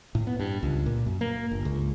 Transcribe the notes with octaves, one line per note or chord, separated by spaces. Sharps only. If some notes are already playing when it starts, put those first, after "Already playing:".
A2
B3
G2
C#2
A#2
F#2
A#3
G1
C#2